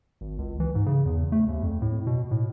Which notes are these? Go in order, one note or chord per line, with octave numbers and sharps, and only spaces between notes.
G#1
C#2
E3
G#2
C#3
E2
A3
D#2
F2
A2
B2
A2